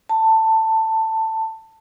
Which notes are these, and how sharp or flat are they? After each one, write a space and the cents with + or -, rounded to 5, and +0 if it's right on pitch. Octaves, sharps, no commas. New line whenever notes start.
A5 +15